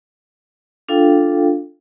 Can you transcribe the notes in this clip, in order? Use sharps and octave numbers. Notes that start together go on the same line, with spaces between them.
D4 F4 A4 F5 G5